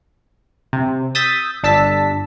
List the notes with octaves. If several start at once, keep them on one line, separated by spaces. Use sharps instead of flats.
C3
D#6 E6 G6 A6 B6
G1 D4 A5 E6 B6